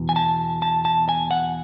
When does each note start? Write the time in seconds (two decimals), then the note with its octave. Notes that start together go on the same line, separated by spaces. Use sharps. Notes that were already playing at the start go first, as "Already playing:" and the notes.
Already playing: E2 B2
0.09 G#5
0.16 A5
0.62 A5
0.85 A5
1.09 G#5
1.31 F#5